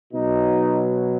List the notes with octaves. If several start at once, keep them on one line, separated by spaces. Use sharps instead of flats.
B2 F#3 D#4